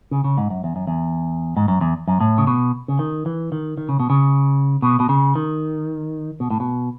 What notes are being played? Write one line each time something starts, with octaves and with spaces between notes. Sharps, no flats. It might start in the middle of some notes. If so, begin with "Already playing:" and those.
C#3
C#3
G#2
F#2
E2
F#2
E2
G#2
F#2
E2
F#2
A2
C#3
B2
C#3
D#3
E3
D#3
D#3
C#3
B2
C#3
B2
B2
C#3
D#3
B2
A2
B2